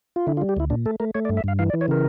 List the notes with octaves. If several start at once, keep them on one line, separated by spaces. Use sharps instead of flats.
F4
D3 E4
F4
G3
G4
D2 E4
A#2 D4
A3 A4
A3 A#4
A3 C#5
D5
G2
E5
G2 F5
E3 F5
D5
E3
C#5
C#3 A#4